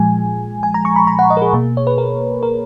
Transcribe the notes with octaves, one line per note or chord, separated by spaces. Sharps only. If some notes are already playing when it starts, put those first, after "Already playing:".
Already playing: A#2 F3 G#3 G#5
G#5
A#5
C#6
B5
A#5
F#5
D#5
A#4
G#4
B2 A#3
C#5
B4
A#4
A#4